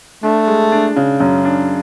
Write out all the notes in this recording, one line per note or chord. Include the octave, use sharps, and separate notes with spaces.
A3 D4
G#3
D4
C#3
F#2
D4